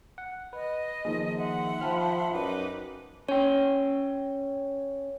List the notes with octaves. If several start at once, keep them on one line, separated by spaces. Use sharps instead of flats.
F#5
B4 D#5
D#3 F3 A#3 D#4 G#4
E5 F#5 C6
F3 G5 A5 B5 F6
F#2 D#4 B4 D6
C#4 C#5 G5